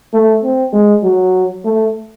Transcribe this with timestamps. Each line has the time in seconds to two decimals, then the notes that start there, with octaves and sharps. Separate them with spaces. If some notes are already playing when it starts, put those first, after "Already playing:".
0.13 A3
0.43 C4
0.73 G#3
1.03 F#3
1.64 A3